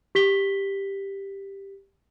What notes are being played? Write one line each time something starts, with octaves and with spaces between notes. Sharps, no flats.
G4 B6 G7